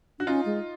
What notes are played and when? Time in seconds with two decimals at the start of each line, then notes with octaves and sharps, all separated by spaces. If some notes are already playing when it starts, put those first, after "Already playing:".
0.19 D4 F#4
0.27 C#4 D#4 F4
0.46 G#3